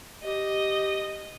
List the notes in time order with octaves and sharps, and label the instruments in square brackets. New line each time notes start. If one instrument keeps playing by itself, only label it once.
[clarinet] G4 [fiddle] D#5